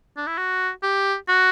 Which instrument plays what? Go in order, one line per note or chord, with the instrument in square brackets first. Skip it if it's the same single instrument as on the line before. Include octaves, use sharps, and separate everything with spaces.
[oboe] D4
E4
F#4
G4
F#4